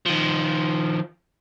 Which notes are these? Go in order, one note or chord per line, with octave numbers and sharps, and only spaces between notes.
D#3 F3